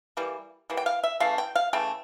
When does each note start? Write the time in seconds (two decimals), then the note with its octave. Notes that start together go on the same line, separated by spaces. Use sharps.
0.17 E3 G3 A#3
0.70 E3 G3 A#3
0.77 G5
0.86 F5
1.03 E5
1.20 C#3 E3 A3 F5
1.38 G5
1.55 F5
1.73 C#3 E3 A3 G5